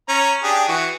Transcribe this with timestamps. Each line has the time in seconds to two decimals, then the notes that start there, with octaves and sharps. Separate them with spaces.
0.09 C#4 A#5
0.43 D4 G4 G#4
0.68 E3 F#4